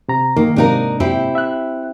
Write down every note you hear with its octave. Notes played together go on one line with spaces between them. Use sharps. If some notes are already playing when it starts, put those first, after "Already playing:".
C3 A#5
D#3 A#3
G#2 C3 A#3 D4 D#4 A#4
C4 E4 G4
E5 F#6